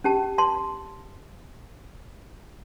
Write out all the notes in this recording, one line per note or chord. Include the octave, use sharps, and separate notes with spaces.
C#4 G4 A5
A5 C6